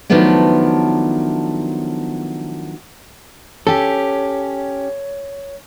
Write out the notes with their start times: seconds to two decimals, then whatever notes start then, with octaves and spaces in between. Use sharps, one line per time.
0.10 D#3 F3 F#3 A3 B3 D4
3.67 C#4 G4 A4 C#5